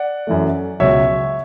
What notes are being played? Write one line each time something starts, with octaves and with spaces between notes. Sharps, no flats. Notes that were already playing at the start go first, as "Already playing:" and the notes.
Already playing: D5 F#5
F#2 E3 A3
C#2 B2 F#3 C#5 E5